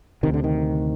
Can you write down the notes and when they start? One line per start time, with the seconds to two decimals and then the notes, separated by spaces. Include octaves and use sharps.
0.23 D2 C3 D#3
0.34 D3
0.44 D#3